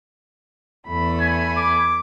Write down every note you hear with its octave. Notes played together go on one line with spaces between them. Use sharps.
E2 A3 B5
G#5
D6